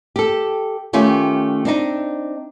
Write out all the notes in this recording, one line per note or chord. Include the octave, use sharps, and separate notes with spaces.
G4 A4
D#3 A3 C#4 F4 G4
C4 D4 D#4